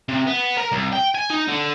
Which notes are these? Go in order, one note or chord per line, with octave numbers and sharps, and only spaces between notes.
C3
B3
A#4
C2
G5
G#5
D#4
D3